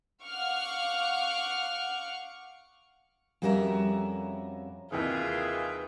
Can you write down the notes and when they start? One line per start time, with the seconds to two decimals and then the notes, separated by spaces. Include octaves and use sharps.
0.23 F5 F#5 C#6 D6 F6
3.42 F2 G3 C#4 F#4 A#4 E5
4.92 D#2 C3 E3 F4 G#4 B4 E5 G5